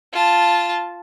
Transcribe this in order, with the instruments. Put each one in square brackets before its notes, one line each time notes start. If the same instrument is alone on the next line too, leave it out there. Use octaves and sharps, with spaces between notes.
[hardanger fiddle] F4 A5